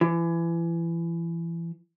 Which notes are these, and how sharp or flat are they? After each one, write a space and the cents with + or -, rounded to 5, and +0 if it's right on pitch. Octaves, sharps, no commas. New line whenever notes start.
E3 +30